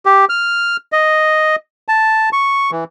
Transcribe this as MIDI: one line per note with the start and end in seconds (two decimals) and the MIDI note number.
0.06 0.25 67
0.29 0.77 89
0.92 1.56 75
1.88 2.29 81
2.33 2.71 85
2.71 2.84 52